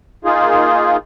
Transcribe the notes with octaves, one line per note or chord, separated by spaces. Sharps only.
A#3 D#4 F4 G#4